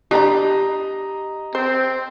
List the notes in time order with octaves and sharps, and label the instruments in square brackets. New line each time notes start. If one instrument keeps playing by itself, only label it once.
[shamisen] D4 D5 B5 [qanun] G4 [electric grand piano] D#5 A#5
[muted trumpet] C4 [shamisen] C5